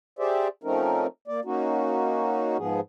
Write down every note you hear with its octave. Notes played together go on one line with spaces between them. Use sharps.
G4 G#4 C5 D5 E5
F3 A3 C4 C#4 D#4 A#4
A#3 D5
A#3 C#4 D#4 F#4
G#2 F3 B3 G#4